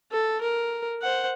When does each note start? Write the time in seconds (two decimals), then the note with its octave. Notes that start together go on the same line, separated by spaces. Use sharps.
0.12 A4
0.41 A#4
1.01 C5 F#5